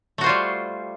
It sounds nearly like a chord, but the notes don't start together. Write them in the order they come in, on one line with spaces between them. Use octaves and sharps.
A3 F#4 C5 F4 G3